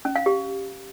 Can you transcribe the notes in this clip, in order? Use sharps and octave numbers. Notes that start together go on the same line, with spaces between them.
C#4
F5
G4